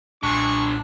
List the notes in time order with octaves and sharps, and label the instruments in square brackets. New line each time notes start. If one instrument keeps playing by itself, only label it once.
[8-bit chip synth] B1 A#2 A5 [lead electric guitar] G2 D3 [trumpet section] G#3 C#6 [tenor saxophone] D4